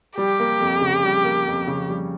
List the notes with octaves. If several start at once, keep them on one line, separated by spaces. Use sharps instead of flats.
G3 G4
A#3
F2
C#3
G3
A#3
F2
C#3
G3